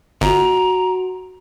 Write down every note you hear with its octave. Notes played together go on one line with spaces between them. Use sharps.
G1 F#4 A#5 D7